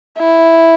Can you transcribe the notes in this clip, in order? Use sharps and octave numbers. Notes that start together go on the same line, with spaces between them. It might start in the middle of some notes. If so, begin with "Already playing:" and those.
E4